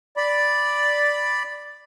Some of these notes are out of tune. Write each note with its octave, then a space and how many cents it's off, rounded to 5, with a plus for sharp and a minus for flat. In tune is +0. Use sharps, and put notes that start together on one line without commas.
D5 +0 B5 +0